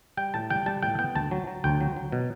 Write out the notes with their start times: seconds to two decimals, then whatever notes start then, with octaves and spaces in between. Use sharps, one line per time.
0.17 G3 G5
0.34 A2 A5
0.50 G3 G5
0.66 G3 A5
0.83 A2 G5
0.99 B3 G5
1.15 D2 A5
1.31 F#3
1.47 F#3
1.64 D2 G5
1.81 F#3
1.96 F#3
2.12 B2